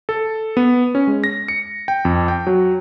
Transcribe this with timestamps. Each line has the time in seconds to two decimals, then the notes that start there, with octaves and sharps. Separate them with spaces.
0.09 A4
0.57 B3
0.95 C#4
1.07 G#3
1.24 A#6
1.48 C#7
1.88 G5
2.05 F2
2.28 G5
2.47 F#3